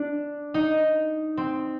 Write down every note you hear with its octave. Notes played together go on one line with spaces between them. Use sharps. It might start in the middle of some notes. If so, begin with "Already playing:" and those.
Already playing: D4
D#4
C4